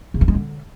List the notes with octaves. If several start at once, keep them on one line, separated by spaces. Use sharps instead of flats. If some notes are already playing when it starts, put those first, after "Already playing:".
C#3
E3
G#3
D3